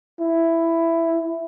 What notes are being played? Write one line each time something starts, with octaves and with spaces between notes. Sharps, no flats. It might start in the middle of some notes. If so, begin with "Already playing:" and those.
E4